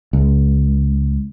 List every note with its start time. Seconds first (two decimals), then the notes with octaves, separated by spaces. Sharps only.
0.13 C#2